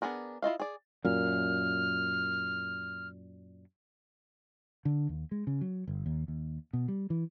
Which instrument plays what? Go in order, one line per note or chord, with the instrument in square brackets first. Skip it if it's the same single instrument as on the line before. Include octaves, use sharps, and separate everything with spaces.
[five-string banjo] B3 D4 G#4 A#4
E4 F4 D#5 F5
G#4 D5
[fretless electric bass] F#2 A#2 [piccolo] F6
[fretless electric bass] D3
D#2
G#3
C#3
F#3
G1
D#2
D#2
B2
G3
E3